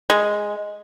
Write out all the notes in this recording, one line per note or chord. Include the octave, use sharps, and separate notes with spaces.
G#3